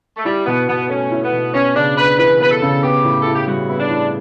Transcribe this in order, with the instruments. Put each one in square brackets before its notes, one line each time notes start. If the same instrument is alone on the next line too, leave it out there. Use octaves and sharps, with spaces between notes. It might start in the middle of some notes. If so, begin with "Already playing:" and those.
[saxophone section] A3
[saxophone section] G3 [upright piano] E4
[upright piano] B2 [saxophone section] B3
[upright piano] B2 [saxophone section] B3
[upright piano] A3 [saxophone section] C#4
[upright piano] E4
[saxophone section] B3
[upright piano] B2
[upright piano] B3 [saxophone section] C#4
[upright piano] C#3 [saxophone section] D4
[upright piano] D4 [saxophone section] B4
[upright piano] E3 [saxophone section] B4
[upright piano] B3 [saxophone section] B4
[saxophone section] A4
[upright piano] C#3
[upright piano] B3 [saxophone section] G4
[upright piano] A2
[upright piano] E4 [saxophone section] A4
[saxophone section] G4
[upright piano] G3 [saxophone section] F#4
[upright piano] B3 [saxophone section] E4
[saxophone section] D4
[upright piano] A2